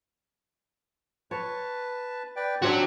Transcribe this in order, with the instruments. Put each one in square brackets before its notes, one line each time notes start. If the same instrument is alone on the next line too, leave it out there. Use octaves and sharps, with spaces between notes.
[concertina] B4 A5 [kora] C#5
[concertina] B4 D5 G5
[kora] C4 D4 G4 [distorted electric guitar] F#4 C#5 [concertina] E5